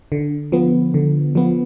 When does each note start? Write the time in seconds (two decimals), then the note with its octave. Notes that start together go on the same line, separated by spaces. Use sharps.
0.12 D3
0.52 F3 B3
0.94 D3
1.35 F3 B3